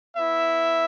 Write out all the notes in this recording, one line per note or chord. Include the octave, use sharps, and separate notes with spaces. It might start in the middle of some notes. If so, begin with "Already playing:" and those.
B3 E4 E5